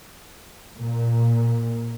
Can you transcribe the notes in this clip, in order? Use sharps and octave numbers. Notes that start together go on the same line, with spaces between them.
A#2